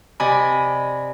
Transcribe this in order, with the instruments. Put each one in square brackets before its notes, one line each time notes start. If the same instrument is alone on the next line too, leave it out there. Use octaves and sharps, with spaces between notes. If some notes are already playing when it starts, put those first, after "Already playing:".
[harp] C3 D5 D#5 G#5 B5